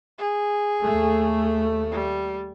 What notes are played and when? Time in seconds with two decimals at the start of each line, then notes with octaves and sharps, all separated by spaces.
0.18 G#4
0.84 D#2 A3
1.91 G3